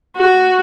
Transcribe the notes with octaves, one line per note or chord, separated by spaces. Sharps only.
F#4